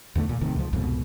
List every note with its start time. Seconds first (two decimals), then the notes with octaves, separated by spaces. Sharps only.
0.15 E2 D3 A3
0.29 A#2
0.41 G#1 A2 C3 D#3
0.56 C#2 F3
0.73 C2 F2 G#2 B2